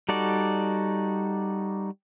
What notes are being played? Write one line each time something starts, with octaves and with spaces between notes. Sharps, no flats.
G3 D#4 F#4 A4 D5